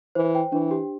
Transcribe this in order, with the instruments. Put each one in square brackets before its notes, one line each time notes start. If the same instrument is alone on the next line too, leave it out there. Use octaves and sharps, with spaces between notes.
[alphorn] E3 [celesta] C5
[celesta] G5
[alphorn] E3 [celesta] D4
[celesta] G4